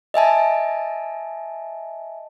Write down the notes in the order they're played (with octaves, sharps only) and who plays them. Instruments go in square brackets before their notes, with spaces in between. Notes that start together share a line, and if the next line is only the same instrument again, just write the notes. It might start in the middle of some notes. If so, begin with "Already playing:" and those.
[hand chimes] D#5 E5 G#5 A5